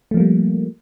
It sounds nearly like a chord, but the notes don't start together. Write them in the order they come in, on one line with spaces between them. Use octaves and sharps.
A3 F3 A#3 G3